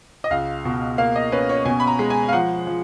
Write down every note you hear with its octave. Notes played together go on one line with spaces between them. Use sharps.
D#5
C#2 F5
B2
A#3 F5
D#5
C#4 B4
C#5
B2 G#5
B5
A#5
G#3
G#5
F5
F3 F#5
F3